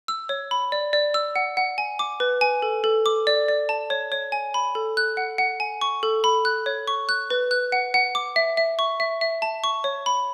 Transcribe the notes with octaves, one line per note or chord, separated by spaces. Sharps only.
E6
C#5
B5
D5
D5
E6
F#5
F#5
G#5
D6
B4
G#5
A4
A4
D6
D5
D5
A5
C#5
C#5
G#5
B5
A4
F#6
F#5
F#5
G#5
C#6
A4
B5
F#6
C#5
C#6
F#6
B4
F#6
F#5
F#5
D6
E5
E5
C#6
E5
E5
A5
C#6
C#5
B5